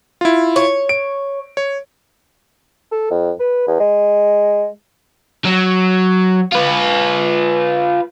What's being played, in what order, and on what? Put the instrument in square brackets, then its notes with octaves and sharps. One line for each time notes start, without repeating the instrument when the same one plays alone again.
[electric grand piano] E4 F4
[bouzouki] C#5
[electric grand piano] D7
C#5
[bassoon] A4
F2
B4
E2
G#3
[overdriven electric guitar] F#3
F4 B4